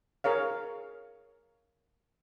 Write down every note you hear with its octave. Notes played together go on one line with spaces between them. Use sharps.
G#4 A#4 C#5 F5